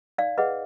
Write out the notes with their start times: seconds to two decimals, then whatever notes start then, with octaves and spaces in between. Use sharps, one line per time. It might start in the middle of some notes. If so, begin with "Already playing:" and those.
0.18 D#4 D5 F5
0.38 G#4 B4 D#5 F#5